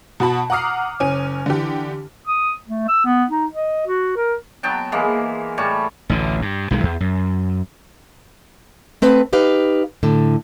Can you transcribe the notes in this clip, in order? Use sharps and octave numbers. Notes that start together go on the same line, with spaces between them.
B2 F#4 A5 B5
F#5 A#5 D6 D#6 F6 C7
F#1 C#4 G#5 D#7
D3 E3 G4
D#6
A3
E6
B3
D#4
D#5
F#4
A#4
F#3 B3 G5 A5
E3 G#3 A#3
A2 G3 C#5 A5
A1 D2 D3
G2
B1 D#3 F#3 G#3
E2
F#2
A3 C4 B4
D#4 G4 B4 F5
A2 D3